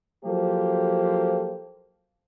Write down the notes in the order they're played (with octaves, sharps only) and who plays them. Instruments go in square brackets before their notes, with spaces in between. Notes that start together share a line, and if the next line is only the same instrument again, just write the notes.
[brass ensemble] F3 F#3 A#3 G4 A4 C5